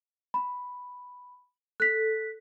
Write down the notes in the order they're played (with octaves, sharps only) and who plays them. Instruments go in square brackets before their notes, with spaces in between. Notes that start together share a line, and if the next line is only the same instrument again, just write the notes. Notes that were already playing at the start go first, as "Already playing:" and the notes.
[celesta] B5
[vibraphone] A4 [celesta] F#6 B6